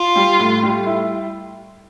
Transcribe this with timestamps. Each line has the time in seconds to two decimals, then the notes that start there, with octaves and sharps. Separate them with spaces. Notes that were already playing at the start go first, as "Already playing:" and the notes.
Already playing: F4
0.16 G3
0.39 A2
0.63 G3
0.86 E4